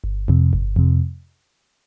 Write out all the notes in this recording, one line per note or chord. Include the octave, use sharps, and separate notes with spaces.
G1
F2 C3
G1
F2 C3